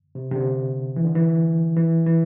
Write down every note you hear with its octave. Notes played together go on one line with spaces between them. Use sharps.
C3
C3
D3
E3
D3
E3
E3
E3